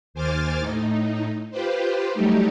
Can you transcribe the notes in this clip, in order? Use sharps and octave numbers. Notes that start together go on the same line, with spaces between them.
D#2 C5 G#5 D6 F6 A6
A2 D#4
F4 G4 B4 C5
F#3 G3 A3 D#4 G4